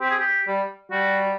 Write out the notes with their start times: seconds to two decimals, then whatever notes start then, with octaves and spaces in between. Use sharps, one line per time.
0.01 C4 G4
0.10 G#4
0.19 G4
0.47 G3
0.92 G3 F#4